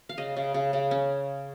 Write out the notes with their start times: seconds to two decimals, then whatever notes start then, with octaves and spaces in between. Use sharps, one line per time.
0.09 F5
0.18 C#3 D#5
0.36 C#3
0.54 C#3
0.73 C#3
0.91 C#4